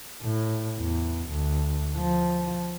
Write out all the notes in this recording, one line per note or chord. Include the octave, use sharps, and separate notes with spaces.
A2
E2
D2
F3